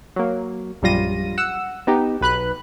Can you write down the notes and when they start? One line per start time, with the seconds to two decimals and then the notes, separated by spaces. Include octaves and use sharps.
0.16 F#3 A#3
0.82 A#1 F#2 G3 F4 A#6 D#7
1.38 F#5 E6
1.87 B3 D#4 G4
2.21 B1 B4 B5 F#6